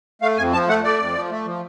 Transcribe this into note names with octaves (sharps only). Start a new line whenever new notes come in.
A3 F5
F2 G#5
F3 A5
A3 F#5
A3 D5
F2
F3
A3
F3